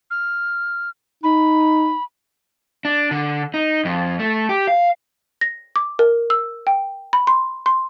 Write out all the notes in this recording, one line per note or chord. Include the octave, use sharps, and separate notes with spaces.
F6
D#4 B5
D4
D3
D#4
F2
A3
G4
F5
A#6
D6
A#4
E6
G5
B5
C6
C6